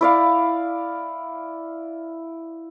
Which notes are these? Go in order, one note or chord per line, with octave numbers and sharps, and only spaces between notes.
E4 D5 F5